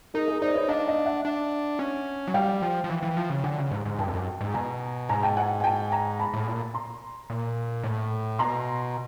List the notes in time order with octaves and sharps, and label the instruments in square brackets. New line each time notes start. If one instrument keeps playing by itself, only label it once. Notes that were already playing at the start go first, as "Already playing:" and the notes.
[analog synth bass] D#4 [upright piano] G#4 A#4
[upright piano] G#4 A#4
[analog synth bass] D#4 [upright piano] C5 D5
[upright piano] B4 C#5
[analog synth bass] D4 [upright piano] D#5 F5
[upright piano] D#5 F5
E5 F#5
[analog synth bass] D4
C#4
F#3
[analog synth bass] G3 [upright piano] F5 G5
[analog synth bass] F3
F3
E3
E3
F3
C#3
[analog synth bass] D3 [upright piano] F#5 G#5
[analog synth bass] C#3
G#2
G#2
[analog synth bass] G2 [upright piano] G5 A5
[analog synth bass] F2
F#2
G#2
[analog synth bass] B2 [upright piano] G#5 A#5
[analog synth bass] G#2 [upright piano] G#5 A#5
[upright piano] G5 A5
F#5 G#5
G#5
G5 A5
G#5 A#5
A5 B5
[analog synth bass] A2
A#2
[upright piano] A#5 C6
[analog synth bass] A#2
A2
[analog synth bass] B2 [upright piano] A#5 C6